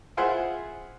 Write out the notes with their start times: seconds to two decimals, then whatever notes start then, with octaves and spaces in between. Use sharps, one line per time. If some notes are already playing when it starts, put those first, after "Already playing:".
0.17 E4 F4 G#4 C5 E5 F#5